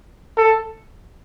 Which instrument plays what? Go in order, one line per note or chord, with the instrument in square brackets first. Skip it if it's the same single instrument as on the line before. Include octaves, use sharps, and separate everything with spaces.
[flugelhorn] A4